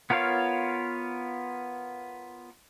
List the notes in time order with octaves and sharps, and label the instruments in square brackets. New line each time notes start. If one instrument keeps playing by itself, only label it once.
[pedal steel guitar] B3 F4 A#4 C#5 F5